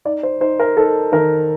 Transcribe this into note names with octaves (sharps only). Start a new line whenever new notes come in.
D#4 D5
C5
D#4 C5
A#4
D#4 A4
D#3 A#4